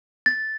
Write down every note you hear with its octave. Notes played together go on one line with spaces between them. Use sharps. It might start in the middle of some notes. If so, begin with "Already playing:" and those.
A6